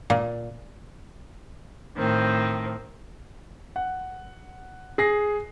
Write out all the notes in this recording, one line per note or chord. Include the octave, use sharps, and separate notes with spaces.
A#2
A2 D#3 C4
F#5
G#4 A#6 C7